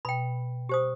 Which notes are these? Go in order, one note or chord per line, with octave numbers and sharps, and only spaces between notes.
B2 G5 B5
G4 C5 D#6